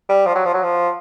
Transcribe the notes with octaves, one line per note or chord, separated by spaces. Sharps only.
G3
F3
F#3
F3
F#3
F3